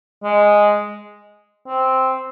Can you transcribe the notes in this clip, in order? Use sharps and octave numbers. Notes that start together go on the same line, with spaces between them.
G#3
C4